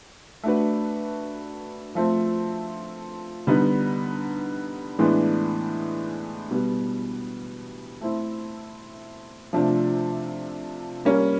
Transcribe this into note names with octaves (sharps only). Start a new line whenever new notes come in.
A3 D4 F#4 B4
F3 A3 C4
D3 G3 B3 D#4
A2 E3 G#3 B3 D4
B2 G3 B3
A3 C4 E4
C3 F3 A3 D4
G3 A#3 C#4